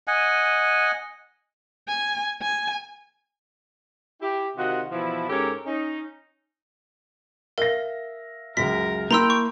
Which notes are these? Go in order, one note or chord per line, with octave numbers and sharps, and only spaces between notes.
D#5 F#5 G#5
G#5
G#5
E4 G4
C3 D#3 F4 F#4 D#5 F#5
B2 E3 F3 E4
G#2 C#4 G4 A4 A#4 C#5
C#4 D#4
A#4 E5 F5 A#6
C#2 F#2 A#4 B6
A#3 E4 G5 A#5 C6 E6
C#6